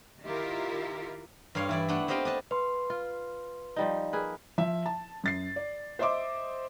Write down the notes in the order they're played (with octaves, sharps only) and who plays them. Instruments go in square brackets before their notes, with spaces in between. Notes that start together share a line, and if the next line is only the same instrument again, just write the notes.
[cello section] D#3 E4 F4 G4 A#4
[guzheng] G2 G3 C#5 F5 C6
E3 E4 D5
A3 B3 D4 F#5 G5
B3 C4 G4 D#5 F5 G5
D4 D#5 A5
[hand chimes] B4 C6 [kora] F5
[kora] F4
F3 G3 D#4
A#3 G#4 B4
[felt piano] F3 E5
A5
F#2 A6 C7
D5
C5 D#5 E5 C6 D6